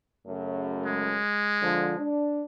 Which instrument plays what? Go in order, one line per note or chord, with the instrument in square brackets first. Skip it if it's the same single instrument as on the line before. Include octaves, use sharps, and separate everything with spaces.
[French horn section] F#2 C#3 A3
[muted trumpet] G#3
[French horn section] D3 F3
D4